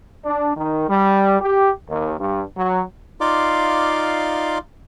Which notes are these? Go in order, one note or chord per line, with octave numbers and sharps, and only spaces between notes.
D4
D#3
G3
G4
D#2
G2
F#3
D#4 F4 D5 F5 C6 D6